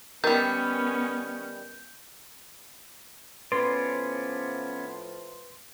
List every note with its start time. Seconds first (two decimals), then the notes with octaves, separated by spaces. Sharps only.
0.24 D#3 G3 B3 C#4 A#4 G6
3.52 A2 F3 B3 C#4 B4 D5 C6